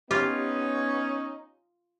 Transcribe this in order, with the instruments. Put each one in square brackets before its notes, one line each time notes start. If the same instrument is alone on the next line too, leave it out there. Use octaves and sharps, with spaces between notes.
[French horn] B3 [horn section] C#4 D#4 [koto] F4 [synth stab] G4